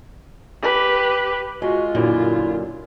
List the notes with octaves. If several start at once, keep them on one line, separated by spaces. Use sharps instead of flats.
G4 B4
G#3 F4 F#4
F#2 A#2 D3 E4